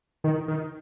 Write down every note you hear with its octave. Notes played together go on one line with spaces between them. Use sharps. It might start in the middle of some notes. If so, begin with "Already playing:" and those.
D#3
D#3